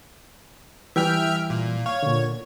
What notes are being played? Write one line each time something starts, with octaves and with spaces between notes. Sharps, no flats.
E3 G3 E5 G5 F6
A#2
C#5 F5
A#2 D3